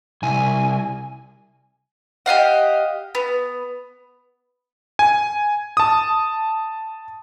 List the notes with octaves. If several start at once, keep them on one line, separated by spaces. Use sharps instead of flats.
C2 G#5
G4 D#5 F5 F#5
B3
G#5
A5 D#6